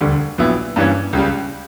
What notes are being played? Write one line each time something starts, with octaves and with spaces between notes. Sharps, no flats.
E1 D2 D3 G3
A#1 A#2 F#3 B3 E4
G2 E3 G3 A#3 C#4
C#2 C#3 G3